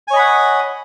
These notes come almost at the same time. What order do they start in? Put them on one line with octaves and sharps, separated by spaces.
G#5 C#5 D#5 B5 F#5